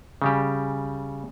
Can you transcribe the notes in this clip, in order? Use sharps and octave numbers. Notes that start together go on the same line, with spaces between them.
C#3 G3 G4